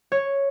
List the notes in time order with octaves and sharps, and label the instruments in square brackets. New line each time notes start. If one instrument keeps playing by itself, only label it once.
[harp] C#5